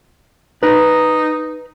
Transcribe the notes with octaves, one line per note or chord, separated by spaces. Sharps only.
D#4 B4 A#5